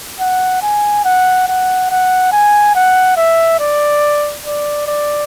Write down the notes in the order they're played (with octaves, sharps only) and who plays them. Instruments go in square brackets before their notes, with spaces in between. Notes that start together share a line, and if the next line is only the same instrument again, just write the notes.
[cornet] F#5
G#5
F#5
F#5
F#5
G#5
F#5
E5
D5
D5
D5